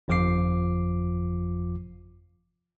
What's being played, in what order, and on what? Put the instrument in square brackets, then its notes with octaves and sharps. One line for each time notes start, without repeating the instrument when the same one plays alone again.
[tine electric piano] G1 F2 F3 F4 D6 C7